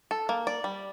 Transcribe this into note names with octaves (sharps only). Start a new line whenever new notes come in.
A4
A#3
D5
G3